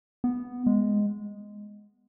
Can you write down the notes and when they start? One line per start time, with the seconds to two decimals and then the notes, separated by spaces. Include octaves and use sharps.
0.24 B3
0.67 G#3